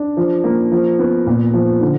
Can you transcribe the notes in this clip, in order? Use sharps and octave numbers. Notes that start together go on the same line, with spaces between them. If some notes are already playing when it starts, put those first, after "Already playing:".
Already playing: D4
F3
A#3
F3
B3
A#2
F3
D3